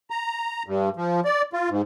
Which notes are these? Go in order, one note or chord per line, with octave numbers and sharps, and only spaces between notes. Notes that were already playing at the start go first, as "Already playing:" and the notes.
A#5
G2
F3
D5
F4
G#2